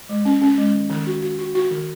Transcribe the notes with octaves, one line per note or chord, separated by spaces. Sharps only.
G#3
C#4
C#4
G#3
D#3
D#3
F#4
F#4
F#4
F#4
D#3